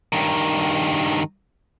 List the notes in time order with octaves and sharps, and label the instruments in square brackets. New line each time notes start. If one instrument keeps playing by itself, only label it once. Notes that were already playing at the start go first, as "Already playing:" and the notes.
[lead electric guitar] G2 D#3